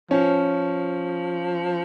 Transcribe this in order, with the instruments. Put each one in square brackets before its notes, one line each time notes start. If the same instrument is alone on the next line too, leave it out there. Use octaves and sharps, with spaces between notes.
[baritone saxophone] F3 [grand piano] C#4